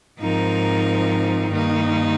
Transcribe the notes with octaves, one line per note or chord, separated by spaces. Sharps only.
G#2 F3 C4 D#4 A#4
G2 D#3 A#3 D#4